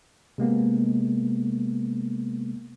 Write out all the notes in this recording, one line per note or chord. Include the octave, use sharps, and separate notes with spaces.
C3 G#3 A#3 B3